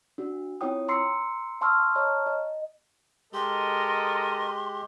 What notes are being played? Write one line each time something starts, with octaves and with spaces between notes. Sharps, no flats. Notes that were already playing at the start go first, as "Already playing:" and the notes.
D4 F#4
C4 E4 F4 C#5 G5 D#6
A#5 C6 E6 C7 C#7
F5 A5 C6 C#6 E6 F6
C#5 D#5 A5 A#5 C#6 F6
D#5
G#3 G4 A4 A#4 D#5 C6